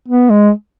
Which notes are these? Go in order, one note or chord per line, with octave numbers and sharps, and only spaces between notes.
B3
G#3